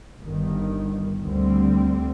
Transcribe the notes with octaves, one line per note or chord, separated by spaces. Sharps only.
G1 G2 D#3
D2 D3 G3 C4